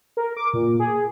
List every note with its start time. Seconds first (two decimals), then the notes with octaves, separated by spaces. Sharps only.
0.17 A#4
0.37 D6
0.53 A#2
0.80 G#4